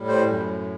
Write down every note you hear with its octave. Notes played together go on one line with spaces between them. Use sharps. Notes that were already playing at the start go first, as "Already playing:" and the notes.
Already playing: A2 G3
C5
F#2